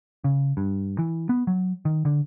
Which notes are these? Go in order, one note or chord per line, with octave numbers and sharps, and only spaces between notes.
C#3
G2
E3
B3
F#3
D#3
D3